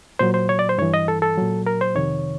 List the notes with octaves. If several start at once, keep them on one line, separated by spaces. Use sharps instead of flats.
A#2 F#3 C5
C5
C#5
D5
C5
G2 E3 C#5
D#5
A4
A4
A#2 F#3
A#4
C5
F2 C3 D#3 C#5